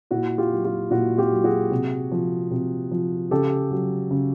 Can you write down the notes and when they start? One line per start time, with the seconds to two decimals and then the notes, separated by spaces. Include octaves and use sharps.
0.11 A#2 E4 F#4
0.38 F4 G4
0.51 F#3
0.64 F4 G4
0.91 A#2 E4 F#4
1.18 F4 G4
1.31 F#3
1.44 F#4 G#4
1.71 C3
2.12 F3
2.51 C3
2.91 F3
3.31 C#3 G4 A4
3.71 F#3
4.11 C#3